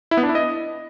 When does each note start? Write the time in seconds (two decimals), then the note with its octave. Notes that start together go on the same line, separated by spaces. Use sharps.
0.11 E4
0.17 B3
0.23 D4
0.29 E4
0.35 D#5